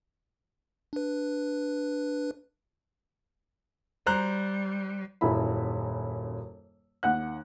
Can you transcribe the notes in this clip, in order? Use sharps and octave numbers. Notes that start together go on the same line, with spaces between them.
D4 B4
G3 C5 A#5 F#6
D#1 F#2 E4 B5
D#2 F#5 F#6